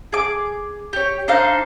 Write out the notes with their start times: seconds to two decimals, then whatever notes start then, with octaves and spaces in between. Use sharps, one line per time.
0.12 G#4 D6
0.93 G4 C#5
1.28 D4 D#4 C5 F5